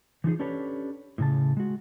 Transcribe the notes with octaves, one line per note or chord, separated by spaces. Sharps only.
E3 F3 D#4 G#4
C#4 D4 G4 A4 B4 C#5
A2 C#3 A5
G#3 F#4